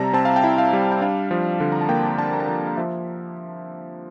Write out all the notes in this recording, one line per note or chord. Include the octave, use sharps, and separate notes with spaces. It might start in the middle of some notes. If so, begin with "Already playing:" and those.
Already playing: C3 G3 E4 D5 E5 A5 A#5
C4 A5
F5
G5
E4
F5
G3
G5
D4 F5
F3
D3
A#5
A5
A#3 G5
D4 A5
A#5
A5
F3 G5
F5
F3 E5